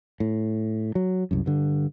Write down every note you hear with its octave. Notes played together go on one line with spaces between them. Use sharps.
A2
F#3
C2 F#2
G2 D3